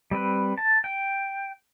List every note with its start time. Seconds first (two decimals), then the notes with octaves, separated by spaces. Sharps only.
0.11 G3 C4 B4
0.58 A5
0.84 G5